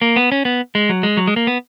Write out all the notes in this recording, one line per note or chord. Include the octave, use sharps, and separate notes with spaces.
A#3
B3
C#4
B3
G#3
F#3
G#3
F#3
G#3
A#3
B3